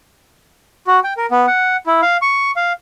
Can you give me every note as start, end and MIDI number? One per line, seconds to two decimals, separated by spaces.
0.87 1.00 66
1.04 1.14 79
1.17 1.26 70
1.31 1.46 59
1.47 1.77 78
1.87 2.01 64
2.02 2.17 77
2.22 2.51 85
2.56 2.73 77